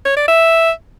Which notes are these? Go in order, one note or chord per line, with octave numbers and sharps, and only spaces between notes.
C#5
D5
E5